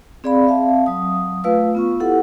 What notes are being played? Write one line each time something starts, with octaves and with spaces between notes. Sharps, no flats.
C4 G#4 D5 F5 B5
C4 E5 F5 A5
F#3 D#6
A3 F4 B4 F5 E6
B3 F4 C#6
E4 G4 A4 F#5 E6